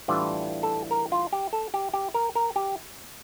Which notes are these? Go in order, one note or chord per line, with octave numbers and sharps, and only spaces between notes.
A2 E3 G3 D4 F4 D5
A4
A#4
F4
G4
A4
G4
G4
A#4
A#4
G4